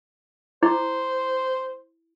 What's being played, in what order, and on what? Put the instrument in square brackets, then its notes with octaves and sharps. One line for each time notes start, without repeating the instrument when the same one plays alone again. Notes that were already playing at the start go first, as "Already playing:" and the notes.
[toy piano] E4 [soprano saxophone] C5